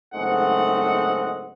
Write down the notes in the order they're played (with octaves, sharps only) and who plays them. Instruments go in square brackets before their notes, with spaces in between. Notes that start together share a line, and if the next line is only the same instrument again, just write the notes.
[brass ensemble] F#1 G#2 A3 C4 D#5 F#5